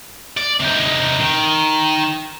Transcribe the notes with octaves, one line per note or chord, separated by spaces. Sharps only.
D5
C3 D#4
D#3